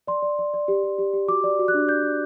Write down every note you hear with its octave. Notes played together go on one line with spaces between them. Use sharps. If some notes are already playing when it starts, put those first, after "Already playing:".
D5 C6
D5
D5
D5
G4
G4
G4
G4
F#4 D6
D5
F#4
F#6
D4
D5 G6
D5